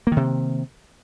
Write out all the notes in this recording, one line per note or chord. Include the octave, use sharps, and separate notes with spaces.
C3 D#3 A#3